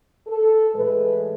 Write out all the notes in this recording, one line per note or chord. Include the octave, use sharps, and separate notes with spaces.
A4
A2 E3 G#3 B4